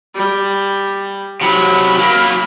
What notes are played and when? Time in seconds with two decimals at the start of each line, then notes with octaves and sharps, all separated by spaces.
0.15 G3
1.42 C3 F#3 B5
1.98 F#3 A#3